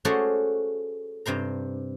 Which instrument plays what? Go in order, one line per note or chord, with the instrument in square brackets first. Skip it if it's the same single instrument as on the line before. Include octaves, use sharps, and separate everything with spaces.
[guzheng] A3 C#4 F#4 G#4 C5 D5
G2 C3 C5 A#5